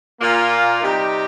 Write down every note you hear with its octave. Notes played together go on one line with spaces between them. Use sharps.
A#2 A#3 F4
C3 G3 D#4 G4